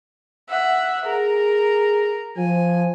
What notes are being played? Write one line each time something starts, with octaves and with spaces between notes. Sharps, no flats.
E5 F#5
G#4 A#4
F3 G#5